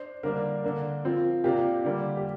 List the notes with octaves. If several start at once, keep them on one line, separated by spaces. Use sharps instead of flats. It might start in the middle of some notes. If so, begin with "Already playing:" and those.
Already playing: D4 C5
D3 G3 A#3 D4 A#4
D3 A#3 D4
F3 C4 F4
C3 A#3 D4 F4 G4
D3 G3 A#3
G4